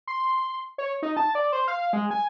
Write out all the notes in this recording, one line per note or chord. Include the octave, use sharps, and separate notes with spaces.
C6
C#5
D#4
A5
D5
C5
F5
G#3
G#5